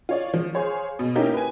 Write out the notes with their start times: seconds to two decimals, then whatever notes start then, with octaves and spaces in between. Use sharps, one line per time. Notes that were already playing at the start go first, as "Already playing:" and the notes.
0.09 F4 C#5 D5
0.34 F3
0.54 G#4 C5 C#5 F5
0.99 B2
1.15 A#3 C#4 D#4 E4 G4 A#4
1.34 B4 G#5